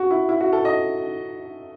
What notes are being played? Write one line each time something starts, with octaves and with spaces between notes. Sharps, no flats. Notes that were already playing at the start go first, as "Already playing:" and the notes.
Already playing: F#4
E4
E4
F#4
A4
D#5